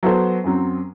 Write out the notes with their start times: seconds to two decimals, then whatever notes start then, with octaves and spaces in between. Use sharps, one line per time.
0.03 F#3 B3 F#4 A4 C5
0.44 F#2 F#3 C4